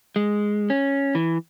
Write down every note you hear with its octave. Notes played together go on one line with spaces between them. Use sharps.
G#3
C#4
E3